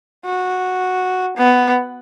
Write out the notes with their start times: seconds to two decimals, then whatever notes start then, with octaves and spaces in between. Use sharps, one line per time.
0.25 F#4
1.37 B3